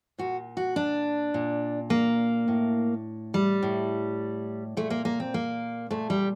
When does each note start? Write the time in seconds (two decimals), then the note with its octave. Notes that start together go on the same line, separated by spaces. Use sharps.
0.18 A#2 F#4
0.57 F#4
0.76 D4
1.34 A#2
1.90 A#3
2.48 A2
3.34 G3
3.63 A2
4.77 A#2 A3
4.90 A#3
5.05 A#3
5.20 C4
5.34 A#3
5.91 A#2 A3
6.10 G3